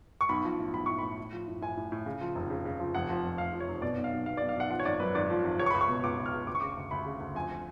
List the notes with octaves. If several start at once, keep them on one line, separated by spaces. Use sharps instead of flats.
C#6
B1 B5
F3
A2
B1 B5
A2 C#6
A2 B5
A2
F3
A2
A2 G#5
A2
A2
C#3
F3
F1
C#3
C#3
F3
F1 F#5
F3
F2
F1 F5
F3
C#5
F1
B2 D5
B1
F5
B1
B2 F5
B1 D5
F5
B1 F#5
F3 F#5
C#5
G#1 D5
F#2 B4
G#1 D5
F3
G#1
C#2 C#5
C#6
C#2 B5
C#6
B2
C#2 D6
C#2
F6
C#2
D2 D6
C#6
C#3 D6
D2
D2 B5
C#3
D2
F2 G#5